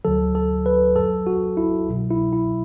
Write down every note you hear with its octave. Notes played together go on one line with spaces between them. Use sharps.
D2 D3 F#3 A4
A4
B4
F#2 F#3 A4
F#4
E4
C2 B2 F#3
E4
E4